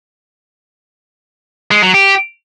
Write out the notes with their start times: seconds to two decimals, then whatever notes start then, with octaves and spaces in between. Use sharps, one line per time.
1.71 G#3
1.83 F#3
1.94 G4